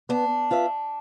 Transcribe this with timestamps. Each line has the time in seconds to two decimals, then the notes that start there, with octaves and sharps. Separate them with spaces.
0.09 B3 D4
0.51 F4 B4 E5